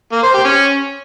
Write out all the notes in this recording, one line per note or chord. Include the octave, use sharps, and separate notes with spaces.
A#3
C5
G4
C#4